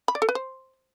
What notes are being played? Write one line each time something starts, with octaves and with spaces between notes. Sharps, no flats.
B5
D5
A4
B4
C5